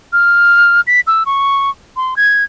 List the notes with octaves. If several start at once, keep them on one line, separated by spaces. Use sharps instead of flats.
F6
B6
E6
C#6
C6
G#6